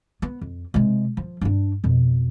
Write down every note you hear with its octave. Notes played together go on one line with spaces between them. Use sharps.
B3
F2
C3 G#3
F3
G2 D4
F2 B2